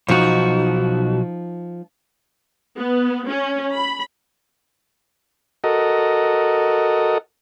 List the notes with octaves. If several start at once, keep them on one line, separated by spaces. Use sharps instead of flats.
B1 F3 D#4 F#4
B3
C#4
B5
F#4 A4 A#4 D#5